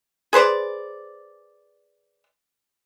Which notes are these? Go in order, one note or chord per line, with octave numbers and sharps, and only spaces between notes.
G#4 B4 C5 D5